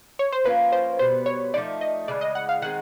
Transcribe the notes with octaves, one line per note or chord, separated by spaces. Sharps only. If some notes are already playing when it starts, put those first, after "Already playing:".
C#5
C5
F3 A#3 C#4 F4 B4
C5
B2 G3 B3 C5
C#5
F3 A3 C4 D#4 D5
D#5
C#3 E3 G#3 D5
D#5
F#5
F5
D#3 G#3 C4 F#5